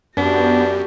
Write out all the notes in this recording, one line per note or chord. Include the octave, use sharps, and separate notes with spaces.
F#2 B3 D4 F#4 G4